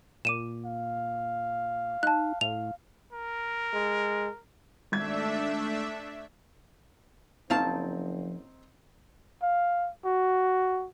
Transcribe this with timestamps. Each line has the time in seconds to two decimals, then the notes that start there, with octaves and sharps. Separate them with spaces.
0.25 A#2 D6 D#7 E7
0.65 F5
2.03 D#4 A5 F#6
2.41 A2 F5 F7
3.13 A#4
3.73 G#3
4.92 G#1 A3 D4 E5 G#6
7.50 F#1 F3 F#3 C4 D#4 F5 A5
9.42 F5
10.05 F#4